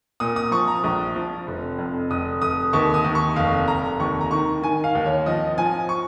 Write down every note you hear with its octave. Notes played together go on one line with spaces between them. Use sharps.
A#2 D#6
D#6
F3 C#6
A#5
A#1
F3
F1
F2
F1 D#6
F1 D#6
D#2 C#6
D#6
D#2
C#6
F1 F5
F1 A#5
D#2 C#6
A#5
D#3 C#6
D#3 G#5
F5
D#2
C#5
F3 D#5
F3 G#5
C#6